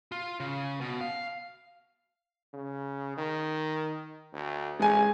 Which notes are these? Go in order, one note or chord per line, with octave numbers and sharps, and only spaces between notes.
F4
C#3
B2
F5
C#3
D#3
D2
A1 G#3 G#5